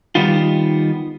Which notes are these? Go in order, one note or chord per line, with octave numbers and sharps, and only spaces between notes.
D#3 G3 B3 D#4 F4